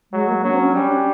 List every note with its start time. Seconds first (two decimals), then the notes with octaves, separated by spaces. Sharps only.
0.12 F#3 G#3
0.28 A#3
0.44 F#3 D4
0.54 C4
0.60 C#4
0.75 G3 C#4
0.91 D4